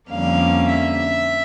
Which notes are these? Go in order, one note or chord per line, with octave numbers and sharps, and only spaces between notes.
F2 D3 G3 A#3 C#4 F5
E5
E5